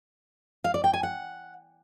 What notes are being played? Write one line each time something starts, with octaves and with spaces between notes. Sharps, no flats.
F5
D5
G5
G#5
F#5